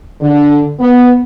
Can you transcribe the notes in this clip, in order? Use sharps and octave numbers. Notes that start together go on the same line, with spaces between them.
D3
B3